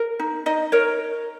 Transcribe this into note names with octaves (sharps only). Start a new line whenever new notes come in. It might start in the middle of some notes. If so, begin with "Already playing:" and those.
Already playing: A#4
D#4
D#4 D#5
A#4 C#5